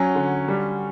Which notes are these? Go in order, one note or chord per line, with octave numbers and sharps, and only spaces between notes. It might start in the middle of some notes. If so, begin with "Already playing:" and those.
Already playing: F#3 C#4
D3
G3